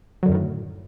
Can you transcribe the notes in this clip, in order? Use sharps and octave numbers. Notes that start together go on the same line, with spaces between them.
F#2 A2 D3 D#3 F#3